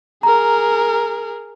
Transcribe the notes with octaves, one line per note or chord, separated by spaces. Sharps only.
G#4 A#4 A#5